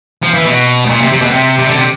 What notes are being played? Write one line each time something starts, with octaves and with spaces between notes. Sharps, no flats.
F3
E3
B2
A2
A#2
C3
C3
B2
C3
C3
D3
C3